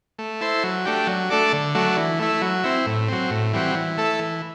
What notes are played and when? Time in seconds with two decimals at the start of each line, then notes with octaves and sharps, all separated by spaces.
0.19 A3
0.41 E4 A4 C5
0.64 F#3
0.85 A3 D4 G4
1.07 F#3
1.30 A3 D4 A4 D5
1.53 D3
1.75 F#3 A3 D4
1.97 E3
2.19 A3 E4
2.42 F#3
2.64 C4 E4
2.86 A2
3.08 F#3 C4
3.30 A2
3.53 E3 G3 C4 F#4
3.75 E3
3.97 A3 E4 A4
4.19 E3